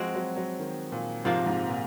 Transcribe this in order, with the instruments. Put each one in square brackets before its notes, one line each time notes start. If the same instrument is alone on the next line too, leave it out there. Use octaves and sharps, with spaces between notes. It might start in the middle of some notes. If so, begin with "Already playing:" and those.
Already playing: [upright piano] F3 [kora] G#3 C4 F#4
[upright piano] F#3
F#3
D#3
A#2
[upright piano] G#2 [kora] C3 F3 A#3 F4
[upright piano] G#2
A#2